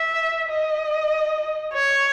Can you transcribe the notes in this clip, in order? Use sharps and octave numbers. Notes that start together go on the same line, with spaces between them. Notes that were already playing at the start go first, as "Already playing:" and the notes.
Already playing: E5
D#5
C#5